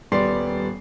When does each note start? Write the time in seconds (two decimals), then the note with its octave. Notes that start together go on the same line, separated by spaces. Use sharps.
0.12 D#1 G3 B3 D5 C6 C7